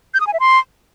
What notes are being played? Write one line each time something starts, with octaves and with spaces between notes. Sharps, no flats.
G6
D#6
G#5
E5
C6